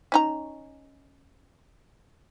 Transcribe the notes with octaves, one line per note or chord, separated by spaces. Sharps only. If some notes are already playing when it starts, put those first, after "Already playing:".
C#4 D#4 A#5